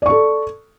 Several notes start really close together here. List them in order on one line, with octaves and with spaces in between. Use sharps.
D5 C#6 A4